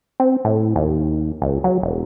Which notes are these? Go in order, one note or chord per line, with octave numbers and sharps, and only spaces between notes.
C4
A2
D#2
C#2
F#3
E1